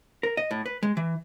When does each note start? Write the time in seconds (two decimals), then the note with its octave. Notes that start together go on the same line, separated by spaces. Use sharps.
0.23 A#4
0.37 D#5
0.51 A2
0.66 B4
0.83 G#3
0.97 E3